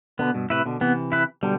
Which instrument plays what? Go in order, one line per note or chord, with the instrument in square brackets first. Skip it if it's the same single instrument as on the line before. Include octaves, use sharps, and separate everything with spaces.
[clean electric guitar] B2 D3 [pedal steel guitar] B3
[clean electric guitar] G2 B2
[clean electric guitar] A2 C3 [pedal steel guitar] E4 B4
[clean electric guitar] B2 D3
[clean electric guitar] C3 E3 [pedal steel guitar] B3
[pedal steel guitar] E4 B4
[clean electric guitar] B2 D3 [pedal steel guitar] G3